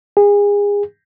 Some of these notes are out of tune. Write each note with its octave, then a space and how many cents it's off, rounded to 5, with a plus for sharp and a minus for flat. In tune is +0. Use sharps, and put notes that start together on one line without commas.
G#4 -30